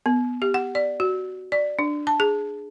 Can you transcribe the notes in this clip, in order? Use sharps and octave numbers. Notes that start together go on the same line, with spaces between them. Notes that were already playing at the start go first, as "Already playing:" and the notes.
B3
G4
F#5
D5
F#4
D5
D4
A5
G#4